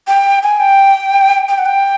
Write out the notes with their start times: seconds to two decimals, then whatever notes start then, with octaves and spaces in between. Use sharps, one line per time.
0.07 G5
0.43 G#5
0.60 G5
1.48 G5
1.58 F#5
1.66 G5